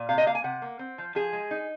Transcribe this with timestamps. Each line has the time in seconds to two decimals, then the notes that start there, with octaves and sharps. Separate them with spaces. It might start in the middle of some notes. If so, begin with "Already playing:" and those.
Already playing: A#2
0.09 C3 F5
0.18 D#5
0.26 A#3 F5
0.35 G#5
0.44 C3 F#5
0.62 A#3
0.79 C4
0.98 F3
1.15 F3 G#4
1.33 G#3
1.51 D#4